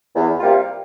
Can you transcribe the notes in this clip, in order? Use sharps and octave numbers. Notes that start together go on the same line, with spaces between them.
E2
C3 G3 A#3 F4